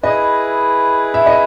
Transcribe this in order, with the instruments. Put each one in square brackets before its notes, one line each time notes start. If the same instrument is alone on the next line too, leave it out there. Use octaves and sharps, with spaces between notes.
[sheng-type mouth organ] E4 G#4 B4 [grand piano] D#5
[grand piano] E5
D#5